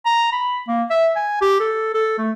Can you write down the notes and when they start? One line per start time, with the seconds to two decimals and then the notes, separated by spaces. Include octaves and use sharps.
0.06 A#5
0.32 B5
0.68 A#3
0.90 E5
1.16 G#5
1.41 G4
1.60 A4
1.94 A4
2.18 A3